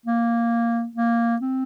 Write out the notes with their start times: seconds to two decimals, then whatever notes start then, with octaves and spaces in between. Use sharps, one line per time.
0.06 A#3
0.96 A#3
1.42 C4